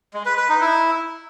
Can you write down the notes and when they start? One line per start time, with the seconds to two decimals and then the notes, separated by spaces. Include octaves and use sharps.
0.14 G#3
0.26 B4
0.37 B4
0.49 D#4
0.61 E4